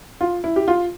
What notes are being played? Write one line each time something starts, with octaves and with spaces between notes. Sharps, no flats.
F4
E4
G4
F4